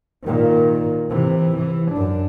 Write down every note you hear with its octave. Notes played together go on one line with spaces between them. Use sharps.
A#2 D#3
C3 E3
E3
F#2 D4